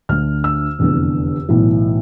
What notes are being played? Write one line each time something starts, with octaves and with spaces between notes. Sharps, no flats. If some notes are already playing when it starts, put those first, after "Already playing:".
D2 D3 F6
E6
F1 E2 D3
B1 A2 E3